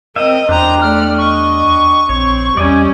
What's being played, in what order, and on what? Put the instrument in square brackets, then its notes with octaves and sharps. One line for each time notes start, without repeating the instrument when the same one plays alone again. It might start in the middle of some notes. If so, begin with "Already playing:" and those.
[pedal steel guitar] C4 E5 [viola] A#4 D#5
[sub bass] E2 [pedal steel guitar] D4 G4 [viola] C5 A#5
[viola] A3 D5 [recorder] F6
[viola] D#5 [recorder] C#6
[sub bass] A#1 [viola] C4 [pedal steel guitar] C#5
[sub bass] E2 [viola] G3 C#4 [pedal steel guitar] D5 D#5 G#5